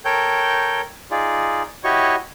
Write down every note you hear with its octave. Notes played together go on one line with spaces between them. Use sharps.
A4 A#4 C#5 G5 G6
D#4 F4 G#4 D5
E4 F#4 G4 C#5 D#5 C#6